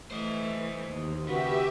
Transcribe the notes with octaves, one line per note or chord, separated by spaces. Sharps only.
E3 A3 C5 D#5
D#2
C#3 F#4 G4 B4 E5